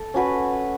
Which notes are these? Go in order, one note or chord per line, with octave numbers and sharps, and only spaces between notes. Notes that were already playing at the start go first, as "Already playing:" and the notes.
Already playing: A4
C#4 F#4 B4